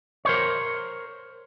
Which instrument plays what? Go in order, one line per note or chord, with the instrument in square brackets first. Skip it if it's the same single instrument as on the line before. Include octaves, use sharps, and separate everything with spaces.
[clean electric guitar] A#4 C5 C#5